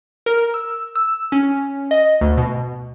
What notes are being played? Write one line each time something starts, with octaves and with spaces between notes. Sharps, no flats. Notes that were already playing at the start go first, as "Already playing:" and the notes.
A#4
E6
E6
C#4
D#5
D2
B2